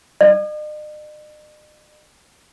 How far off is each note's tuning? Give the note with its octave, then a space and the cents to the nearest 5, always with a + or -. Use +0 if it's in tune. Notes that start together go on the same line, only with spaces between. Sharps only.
D#5 -45